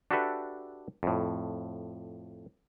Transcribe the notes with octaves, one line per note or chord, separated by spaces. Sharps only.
D4 F#4 G4 A4 B4 E5
F2 A2